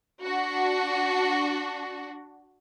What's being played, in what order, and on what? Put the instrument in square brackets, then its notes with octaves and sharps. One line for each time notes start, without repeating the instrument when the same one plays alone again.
[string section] D4 F#4